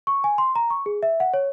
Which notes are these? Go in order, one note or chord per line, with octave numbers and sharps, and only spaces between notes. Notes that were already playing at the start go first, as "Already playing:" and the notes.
C#6
G#5
C6
A#5
C#6
G#4
E5
F#5
C#5